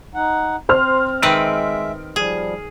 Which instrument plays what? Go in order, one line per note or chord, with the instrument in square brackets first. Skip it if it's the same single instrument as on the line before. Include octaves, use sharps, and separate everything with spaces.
[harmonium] D#4 F#5
[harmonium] C4 [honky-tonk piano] C5 C6 F6
[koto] D#3 C4 B4 [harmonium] G#3 E5 [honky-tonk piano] D7
[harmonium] F3 G3 [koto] G#4